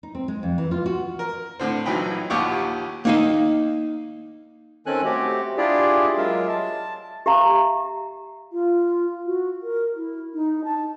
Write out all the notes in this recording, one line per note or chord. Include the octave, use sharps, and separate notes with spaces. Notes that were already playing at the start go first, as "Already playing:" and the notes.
D#4
C4
G#3
F2
E3
F4
F#4
A#4
A2 D3 C4
A#1 E3 F#3 D#4 G5 B5
A#1 D#2 G4 F#5 C#6 D6
A#3 D#4 F5
D#3 C4 C#4 A4 G#5 F#6
A3 C4 F#4 G4
D4 E4 F4 G4 G#4 D5
F#3 G#3 F4 A#4 E5
A5
G4 E5 F5 A#5
F4
F#4
A#4
E4
D#4
A5